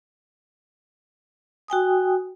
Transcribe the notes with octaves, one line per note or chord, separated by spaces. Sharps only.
F#4 G5 G#5 D#6